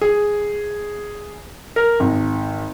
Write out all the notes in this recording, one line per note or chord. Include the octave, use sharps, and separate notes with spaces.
G#4
A#4
G#1